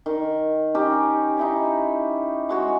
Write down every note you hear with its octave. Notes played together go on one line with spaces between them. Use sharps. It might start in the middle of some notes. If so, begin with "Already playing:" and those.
D#3
C#4 D#4 G4
D#4 E4 C#5
G#3 F#4 C#5